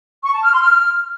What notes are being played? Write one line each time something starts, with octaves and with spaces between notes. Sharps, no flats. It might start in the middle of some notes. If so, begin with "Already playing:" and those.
C#6
A5
F6
C6
F6